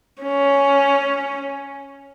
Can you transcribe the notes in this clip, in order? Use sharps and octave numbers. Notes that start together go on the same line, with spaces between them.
C#4